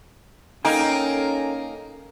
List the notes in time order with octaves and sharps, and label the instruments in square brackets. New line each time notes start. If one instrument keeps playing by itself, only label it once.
[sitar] A#3 D#4 [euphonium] C#4 [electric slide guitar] A4 G5 G#5